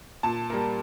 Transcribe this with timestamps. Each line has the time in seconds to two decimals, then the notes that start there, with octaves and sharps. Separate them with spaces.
0.23 A#2 A5
0.50 G3 A#3